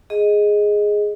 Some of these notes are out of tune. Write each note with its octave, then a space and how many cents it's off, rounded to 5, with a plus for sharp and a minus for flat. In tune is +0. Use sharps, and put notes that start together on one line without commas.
G#4 +0 D#5 +0